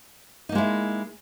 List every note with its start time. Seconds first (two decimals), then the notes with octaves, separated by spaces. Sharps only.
0.49 D#4
0.52 A#3
0.55 G#3
0.58 E4